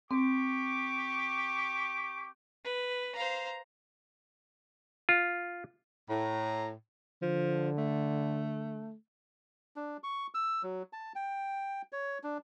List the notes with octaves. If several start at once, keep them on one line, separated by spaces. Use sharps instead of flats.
C4 G4 C#6 D6
B4
C5 F5 A#5
F4
A2 A#5
D3 F3
A3
D4
C#6
E6
F#3
A5
G5
C#5
D4